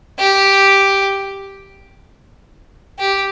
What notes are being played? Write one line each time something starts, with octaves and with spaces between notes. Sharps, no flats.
G4
G4